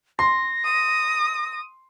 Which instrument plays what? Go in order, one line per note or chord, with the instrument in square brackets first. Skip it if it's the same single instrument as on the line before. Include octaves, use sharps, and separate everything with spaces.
[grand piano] C6 [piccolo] A#6
[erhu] D#6